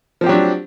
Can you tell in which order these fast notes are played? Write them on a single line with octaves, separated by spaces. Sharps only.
F3 C4 G4 F#3 D4